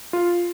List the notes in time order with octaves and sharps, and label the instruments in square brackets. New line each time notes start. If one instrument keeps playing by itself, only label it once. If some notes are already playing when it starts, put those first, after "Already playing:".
[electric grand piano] F4